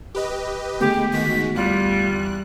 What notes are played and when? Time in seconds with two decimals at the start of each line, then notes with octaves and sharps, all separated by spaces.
0.15 G4 B4 D#5
0.80 D3 G#3 A3 B3 G4
1.13 D#3 G#3 F#4 B6
1.56 E2 G3 F4 F#6